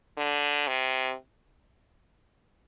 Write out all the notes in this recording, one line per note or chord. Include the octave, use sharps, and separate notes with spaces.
D3
C3